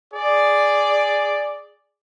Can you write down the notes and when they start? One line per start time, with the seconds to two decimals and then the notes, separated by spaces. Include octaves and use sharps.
0.14 G#4 D5